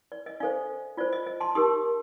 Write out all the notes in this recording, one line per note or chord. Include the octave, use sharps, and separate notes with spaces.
D5
D#5
D4 A4 C5 D5 F5
F4 C5 D5
D#5
D#5
A5 C6
D#4 G4 A#4 C6 D#6